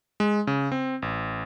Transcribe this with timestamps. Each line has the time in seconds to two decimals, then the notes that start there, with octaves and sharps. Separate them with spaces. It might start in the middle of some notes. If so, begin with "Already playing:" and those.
0.20 G#3
0.47 C#3
0.72 C4
1.02 A1